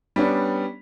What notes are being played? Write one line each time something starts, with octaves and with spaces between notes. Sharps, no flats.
G3 B3 C#4 D4